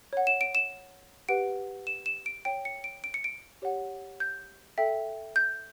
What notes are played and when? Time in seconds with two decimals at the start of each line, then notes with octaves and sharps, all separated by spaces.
0.13 C#5 F#5
0.27 E7
0.41 D7
0.55 E7
1.29 G4 B4 F#5 D7
1.87 E7
2.06 E7
2.26 D7
2.45 C#5 G5 D7
2.65 C#7
2.84 D7
3.04 D7
3.14 C#7
3.24 D7
3.62 G4 C#5 F#5
4.20 G6
4.78 A4 E5 G5
5.36 G6